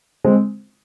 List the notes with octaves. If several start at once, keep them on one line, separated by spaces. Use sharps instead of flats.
G#3 C4